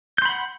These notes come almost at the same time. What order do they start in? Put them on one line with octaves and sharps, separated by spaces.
G6 C6 B5 F#5